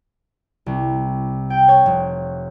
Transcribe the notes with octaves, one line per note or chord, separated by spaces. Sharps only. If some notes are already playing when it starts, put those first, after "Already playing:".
C2
G5
C#5
F1